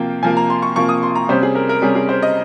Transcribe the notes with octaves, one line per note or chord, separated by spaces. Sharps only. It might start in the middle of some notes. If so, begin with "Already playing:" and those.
Already playing: C3 F3 A#3 G5
C3 F3 A#3 G#5
A#5
C6
C#6
C3 F3 A#3 C#6
D#6
C6
A#5
C3 G3 C#4 C5
G#4
A#4
A#4
C3 G3 C#4 G#4
G#4
C5
D#5